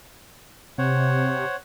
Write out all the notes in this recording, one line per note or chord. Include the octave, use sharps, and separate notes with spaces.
C3 C5 C#5 F#5